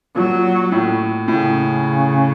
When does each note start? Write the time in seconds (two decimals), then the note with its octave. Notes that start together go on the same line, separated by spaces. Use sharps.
0.16 A#2 F#3
0.72 A2
1.28 A2 C#3